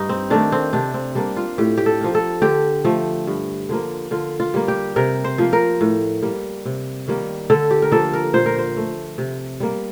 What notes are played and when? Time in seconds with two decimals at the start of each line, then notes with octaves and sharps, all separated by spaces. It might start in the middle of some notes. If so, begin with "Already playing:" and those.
Already playing: G2 D#4
0.09 C4
0.30 D#3 A3 D4
0.52 C4
0.73 C3 D4
0.94 C4
1.15 G3 A#3 D4
1.37 F4
1.58 A2 G4
1.78 G4
1.86 A4
2.01 F3 A#3
2.15 A4
2.42 D3 G4
2.85 F3 A3
3.27 G2
3.69 D3 F3 A#3
4.11 D3 F4
4.40 F4
4.54 G3 A#3
4.68 G4
4.96 C3 A#4
5.24 C5
5.38 F3 A#3
5.53 A#4
5.81 A2
6.22 G3 A#3
6.65 C3
7.08 D#3 G3 A#3
7.50 D3 A4
7.71 G4
7.82 A#4
7.91 F3 A#3 A4
8.13 A#4
8.33 A#2 C5
8.46 A#4
8.58 C5
8.77 A3
9.18 C3
9.60 G3 A#3